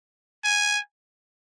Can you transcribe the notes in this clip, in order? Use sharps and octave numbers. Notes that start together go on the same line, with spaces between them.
G#5